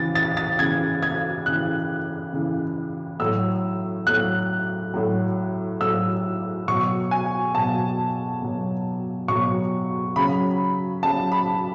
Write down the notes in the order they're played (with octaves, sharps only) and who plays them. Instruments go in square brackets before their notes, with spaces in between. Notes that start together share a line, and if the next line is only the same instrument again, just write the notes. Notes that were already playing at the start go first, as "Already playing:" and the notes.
Already playing: [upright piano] C#3 E3 A6
A6
A6
C#3 E3 G#6
G#6
C#3 E3 F#6
C#3 E3
A2 F#3 E6
A2 F#3 F#6
A2 F#3
A2 F#3 E6
B2 F#3 C#6
G#5
B2 F#3 A5
B2 F#3
B2 F#3 C#6
C#3 F#3 B5
C#3 F#3 A5
B5